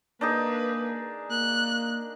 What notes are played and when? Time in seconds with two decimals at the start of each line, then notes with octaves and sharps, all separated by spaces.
0.21 A#3 D4 D#4 G#4 B4
1.30 A#3 F#6